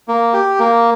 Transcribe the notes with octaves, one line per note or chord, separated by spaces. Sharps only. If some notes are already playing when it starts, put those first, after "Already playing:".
A#3
G4
A#3